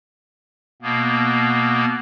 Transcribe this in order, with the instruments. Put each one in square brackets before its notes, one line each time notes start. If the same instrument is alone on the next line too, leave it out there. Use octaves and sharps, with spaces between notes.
[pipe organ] B2 A#3 B3